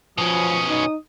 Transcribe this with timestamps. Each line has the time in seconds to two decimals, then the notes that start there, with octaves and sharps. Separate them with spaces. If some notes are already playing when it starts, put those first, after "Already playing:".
0.18 B2 F3 C#4 D#6
0.69 D#4